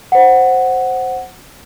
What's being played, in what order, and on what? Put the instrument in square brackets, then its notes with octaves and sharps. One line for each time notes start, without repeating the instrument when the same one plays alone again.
[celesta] C5 F#5